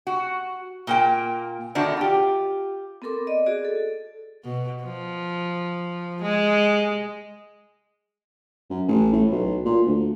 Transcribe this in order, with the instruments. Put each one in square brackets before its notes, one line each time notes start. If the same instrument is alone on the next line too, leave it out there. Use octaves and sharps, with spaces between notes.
[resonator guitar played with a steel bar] F#4
A#2 A#3 G5
D3 D#3 D4 E4 F#4
F4 G4
[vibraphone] B3 C4 A4 A#4 D6
D5 D#5
F#4 G#4 D5
A4
[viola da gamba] B2
F3
G#3
[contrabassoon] F#2
A1
A2
B1
A#2
D2